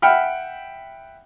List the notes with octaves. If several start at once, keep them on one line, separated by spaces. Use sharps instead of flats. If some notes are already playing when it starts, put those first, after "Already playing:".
E5 F#5 G5 B5 F6